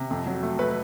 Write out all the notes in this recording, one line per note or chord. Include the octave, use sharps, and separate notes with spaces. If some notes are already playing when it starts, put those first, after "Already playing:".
Already playing: C3
F2
F#3
A3
A3 B4